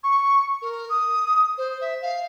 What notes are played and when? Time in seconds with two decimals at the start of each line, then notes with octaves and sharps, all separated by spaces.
0.03 C#6
0.62 A#4
0.89 D#6
1.58 C5
1.81 E5
2.02 F5